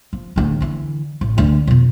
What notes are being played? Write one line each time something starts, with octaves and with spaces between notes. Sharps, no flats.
F3
D1 D2
D3 E3
A1
D2
F2 B2